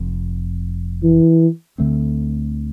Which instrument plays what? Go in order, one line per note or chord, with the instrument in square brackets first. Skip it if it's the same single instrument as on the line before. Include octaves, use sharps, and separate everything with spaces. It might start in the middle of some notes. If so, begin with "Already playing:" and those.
Already playing: [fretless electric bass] F1 F2
[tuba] E3
[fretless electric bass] D2 D3 A3 C4